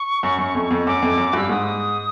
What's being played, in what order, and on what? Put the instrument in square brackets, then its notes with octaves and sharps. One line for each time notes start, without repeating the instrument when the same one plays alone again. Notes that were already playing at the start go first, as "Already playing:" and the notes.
Already playing: [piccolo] C#6
[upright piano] F#2
F#2
F2
F2
[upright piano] F#2 [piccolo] D6
[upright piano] F2
F#2
[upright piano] G2 [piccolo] E6
[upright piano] G#2 [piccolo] D#6